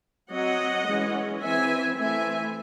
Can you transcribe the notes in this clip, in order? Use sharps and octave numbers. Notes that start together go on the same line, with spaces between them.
F#3 C4 D#5 F#5
E3 G#3 C#4
E3 C4 E5 G#5
E3 A3 C4 E5 G#5